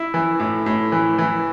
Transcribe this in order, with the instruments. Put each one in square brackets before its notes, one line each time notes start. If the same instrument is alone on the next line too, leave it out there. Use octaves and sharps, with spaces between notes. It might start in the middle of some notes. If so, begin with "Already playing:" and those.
Already playing: [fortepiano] E4
E3
A2
A2
E3
E3